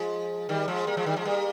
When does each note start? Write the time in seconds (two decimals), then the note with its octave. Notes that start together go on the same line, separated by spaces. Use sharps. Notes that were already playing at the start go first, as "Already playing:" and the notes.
Already playing: F3 G#3
0.49 D#3 G3
0.68 F3 G#3
0.87 G3 A#3
0.97 F3 G#3
1.06 D#3 G3
1.16 F3 G#3
1.25 G3 A#3